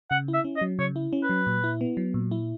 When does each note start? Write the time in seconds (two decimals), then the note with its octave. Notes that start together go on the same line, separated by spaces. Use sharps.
0.11 C#3 F#5
0.28 E4
0.34 E5
0.44 C#4
0.56 D#5
0.61 F#3
0.79 C#3 C#5
0.96 E4
1.13 C#4
1.23 B4
1.30 F#3
1.47 A#2
1.64 E4
1.81 B3
1.97 F#3
2.14 A#2
2.31 E4